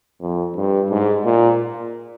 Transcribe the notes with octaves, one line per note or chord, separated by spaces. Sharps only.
F2
G2
G#2
A#2